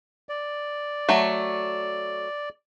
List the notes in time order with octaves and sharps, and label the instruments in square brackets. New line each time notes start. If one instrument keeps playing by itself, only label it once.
[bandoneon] D5
[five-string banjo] F#3 A3